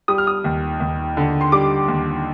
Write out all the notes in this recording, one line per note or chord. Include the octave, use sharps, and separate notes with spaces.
G3 D#6
F6
D#6
D#2
D#2
D3
C6
G3 D6
D#2